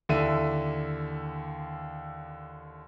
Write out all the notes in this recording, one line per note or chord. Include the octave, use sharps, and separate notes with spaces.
D#2 D3 E4 E5 D#7